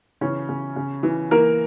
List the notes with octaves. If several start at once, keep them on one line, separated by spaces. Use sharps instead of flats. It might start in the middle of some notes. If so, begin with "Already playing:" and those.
C#3 E3 C#4
C#3
C#3
E3
E3 A#3 A#4